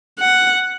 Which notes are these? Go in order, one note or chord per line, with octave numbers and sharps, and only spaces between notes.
F#5